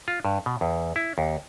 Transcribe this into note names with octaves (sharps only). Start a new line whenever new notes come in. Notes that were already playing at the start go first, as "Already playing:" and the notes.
F4
G2
B2
E2
E4
D#2